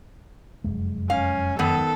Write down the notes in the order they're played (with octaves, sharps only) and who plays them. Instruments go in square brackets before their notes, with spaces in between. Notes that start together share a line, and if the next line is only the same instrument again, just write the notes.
[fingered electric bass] F1 F#2 G#3
[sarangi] C#4 [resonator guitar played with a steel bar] F5
[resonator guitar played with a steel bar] D#3 B3 [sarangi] A4